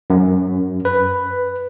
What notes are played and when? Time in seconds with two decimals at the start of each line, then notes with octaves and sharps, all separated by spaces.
0.10 F#2
0.85 B4